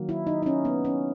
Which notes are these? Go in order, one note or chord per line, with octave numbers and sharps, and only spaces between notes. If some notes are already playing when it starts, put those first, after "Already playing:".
Already playing: D#3 F#3 A#3
E4
D#4
D#4
C#4
B3
C#4